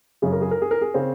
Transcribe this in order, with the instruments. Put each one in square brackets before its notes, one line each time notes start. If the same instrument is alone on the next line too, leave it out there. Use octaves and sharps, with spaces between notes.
[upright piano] F#2 C#3 G#4
A#4
G#4
A#4
G#4
A#4
G#4
C#3 C4